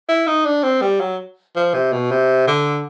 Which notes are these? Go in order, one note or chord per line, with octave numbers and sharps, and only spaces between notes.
E4
D#4
D4
C4
G3
F#3
F3
C3
B2
C3
D3